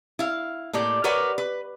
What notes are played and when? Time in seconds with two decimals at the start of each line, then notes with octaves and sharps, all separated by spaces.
0.19 E4 F5
0.73 A2 A#3 G4 D5
1.04 G4 A#4 B4 C#5 D5 F#5
1.38 B4